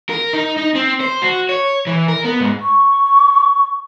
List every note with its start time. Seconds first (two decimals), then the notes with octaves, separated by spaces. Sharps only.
0.10 A#4
0.33 D#4
0.57 D#4
0.75 C4
1.00 C5
1.22 F#4
1.49 C#5
1.87 E3
2.08 A#4
2.25 B3
2.40 G#2
2.62 C#6